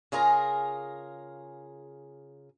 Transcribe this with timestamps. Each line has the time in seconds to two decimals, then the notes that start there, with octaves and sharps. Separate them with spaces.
0.12 C#3 F4 G#4 A#4 A#5